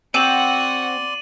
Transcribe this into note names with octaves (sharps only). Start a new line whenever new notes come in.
C4 F#4 D5 F#5 C6 D#7 F#7